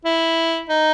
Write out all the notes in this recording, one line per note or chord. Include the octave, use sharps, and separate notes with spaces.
E4
D#4